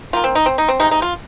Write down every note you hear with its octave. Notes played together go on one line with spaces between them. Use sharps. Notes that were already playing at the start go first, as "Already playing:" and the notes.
D#3 A#3 F4
C4
D#4
C4
D#4
C4
C3 G#3 D#4
D#4
F4